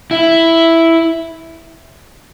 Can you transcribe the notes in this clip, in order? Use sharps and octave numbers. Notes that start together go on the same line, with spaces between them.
E4